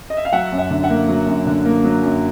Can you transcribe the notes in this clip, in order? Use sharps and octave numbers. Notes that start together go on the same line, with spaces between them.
D#5
E5
F5
F#3 E5 F#5
F#2
E5 F#5
D3
E5 F#5
A#3
F#3
F#2
D3
A#3
F#3
F#2